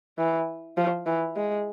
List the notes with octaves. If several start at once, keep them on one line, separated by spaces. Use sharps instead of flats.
E3
F3
E3
G#3